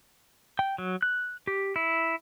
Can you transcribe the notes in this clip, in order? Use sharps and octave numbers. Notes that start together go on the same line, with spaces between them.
G5
F#3
F#6
G4
E4